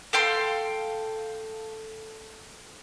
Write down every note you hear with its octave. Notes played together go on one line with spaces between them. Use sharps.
A4 F5 G5 C6